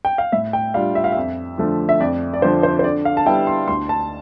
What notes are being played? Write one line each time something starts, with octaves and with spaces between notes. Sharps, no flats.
G5
F5
A2 E5
G5
G3 D4 F4 F5
E5
F5
F2 E5
D3 F3 A3
E5
F2 D5
D5
D3 F3 C5
C5
C5
D3 D5
F5
A5
G3 B3 E4 G5
C6
D2 C6
A5